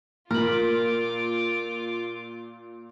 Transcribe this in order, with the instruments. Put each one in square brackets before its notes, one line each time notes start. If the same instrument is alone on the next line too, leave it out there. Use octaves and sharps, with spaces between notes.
[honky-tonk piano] A#2 [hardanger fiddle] F4 D6 [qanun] A#4 B5